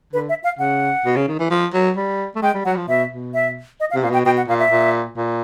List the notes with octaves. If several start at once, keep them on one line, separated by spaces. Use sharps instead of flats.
D3 B4
E5
F5
C#3 F#5
B2
C#3
D#3
E3
F3
F#3
G3
A3
G#3 G5
G3
F#3 F#5
F3
B2 E5
B2
E5
D#5
F5
C3
A#2 F5
B2 G5
B2 G5
F#5
A#2 F5
E5
A#2
A#2